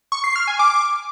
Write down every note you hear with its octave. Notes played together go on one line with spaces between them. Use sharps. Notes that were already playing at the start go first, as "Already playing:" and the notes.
C#6
C7
F6
G#5
D6